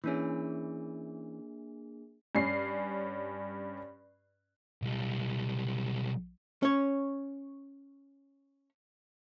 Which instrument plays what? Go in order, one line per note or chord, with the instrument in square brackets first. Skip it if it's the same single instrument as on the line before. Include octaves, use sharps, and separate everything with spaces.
[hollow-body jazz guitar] E3 C#4 [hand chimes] A#3 D4 G#4
[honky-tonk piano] G2 C#4 C7
[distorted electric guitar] B1 G3
[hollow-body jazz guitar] C#4 C#5